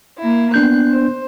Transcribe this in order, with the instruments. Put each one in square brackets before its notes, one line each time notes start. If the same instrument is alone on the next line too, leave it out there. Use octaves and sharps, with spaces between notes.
[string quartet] A#3 E4
[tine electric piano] B3 D4 G6 [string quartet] F#6
[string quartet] C5